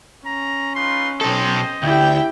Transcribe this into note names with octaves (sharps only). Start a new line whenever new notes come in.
C#4 A#5
D#4 F4 B4 C6
B1 C4 A4 C5 D#5
D2 E4 G4 G5